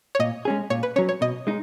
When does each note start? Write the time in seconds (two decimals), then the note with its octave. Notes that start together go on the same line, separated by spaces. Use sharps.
0.15 C#5
0.20 A#2 D#5
0.45 G#3 C#4 G#4
0.70 A#2 C#5
0.83 B4
0.96 F#3 C#4 C#5
1.09 C#5
1.21 B2 D#5
1.47 G#3 D#4